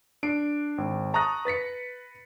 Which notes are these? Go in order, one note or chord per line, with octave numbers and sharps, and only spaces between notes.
D4 C7 D7
G#1
A5 A#5 C#6 D#6 F#6 A#6
B4 A6 B6 C#7